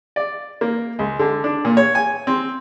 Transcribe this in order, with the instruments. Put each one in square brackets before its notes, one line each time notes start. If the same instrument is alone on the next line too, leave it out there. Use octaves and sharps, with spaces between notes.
[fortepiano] D5
A#3
C#2
D3
D4
A#2
C#5
G#5
C4